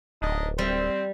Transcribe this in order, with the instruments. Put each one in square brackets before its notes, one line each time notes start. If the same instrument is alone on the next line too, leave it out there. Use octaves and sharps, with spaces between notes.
[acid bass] D1 [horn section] D4 D#4 D#5
[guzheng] G3 [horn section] C4